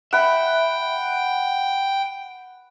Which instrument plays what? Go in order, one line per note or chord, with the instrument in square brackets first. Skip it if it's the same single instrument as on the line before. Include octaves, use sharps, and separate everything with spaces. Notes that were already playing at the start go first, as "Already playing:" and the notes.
[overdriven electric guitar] E5 [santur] F#5 B5 [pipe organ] G5